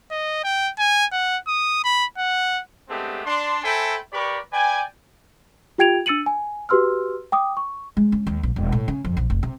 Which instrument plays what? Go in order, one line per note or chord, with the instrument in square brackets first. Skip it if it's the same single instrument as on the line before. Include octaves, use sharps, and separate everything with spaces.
[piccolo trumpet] D#5
G5
G#5
F#5
D#6
B5
F#5
[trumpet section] G#3 A3 B3 C4 D4 G4
D4 C6
A4 C5 E5 G5 G#5 B5
G4 A#4 B4 D5 B5 C#6
B4 D5 G5 G#5
[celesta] F4 G4 G5 G#6 D7 F7
D4 E6 A6 C#7 D#7 F#7
G#5
F#4 G4 B4 C6 E6 F6
G5 D6 D#6
C#6
[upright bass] G#3
C#4
D#2
A#1
E1
A2
C#3
F2
A#1
F1
C3